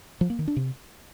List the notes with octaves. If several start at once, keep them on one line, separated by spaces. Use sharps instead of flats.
F3
A#3
D#3
D4
C3